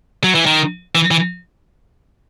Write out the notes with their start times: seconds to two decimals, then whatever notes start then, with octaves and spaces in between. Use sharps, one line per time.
0.24 F#3
0.35 E3
0.46 D#3
0.95 E3
1.11 E3